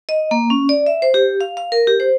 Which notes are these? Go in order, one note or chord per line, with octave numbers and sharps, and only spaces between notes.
D#5
A#3
C#4
D5
E5
C5
G4
F5
F5
A#4
G4
C5